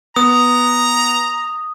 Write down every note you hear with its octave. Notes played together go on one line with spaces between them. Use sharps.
B3 A#5 D#6